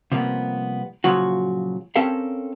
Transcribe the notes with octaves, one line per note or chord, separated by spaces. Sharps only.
C3 F3 G3 A#3 B3
A#2 C#3 F3 F#3 F#4
C4 C#4 G4 A4 A#4 F5